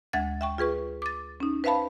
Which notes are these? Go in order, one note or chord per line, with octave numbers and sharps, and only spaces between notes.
D2 G#3 E5 F#5 G#6 A6
E5 G5 C#6
F4 G#4 B4 C#6
D6 A6
C#4 D#4
B4 C5 E5 F5 A5 B5